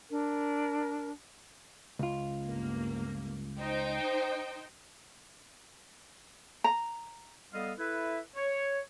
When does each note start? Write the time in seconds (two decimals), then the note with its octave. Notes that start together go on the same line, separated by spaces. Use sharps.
0.09 D4 A#4
1.99 C#2 F4
2.44 G1 A#3
3.58 D#4 C5 G5
6.64 A#5
7.53 G3 B3 A4 D#5 F5
7.78 E4 A4 B4 E5
8.35 C#5